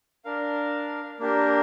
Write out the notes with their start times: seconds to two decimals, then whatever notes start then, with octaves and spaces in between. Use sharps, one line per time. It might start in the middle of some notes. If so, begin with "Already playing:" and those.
0.25 D4 A#4 F5
1.19 A#3 D4 G4 A#4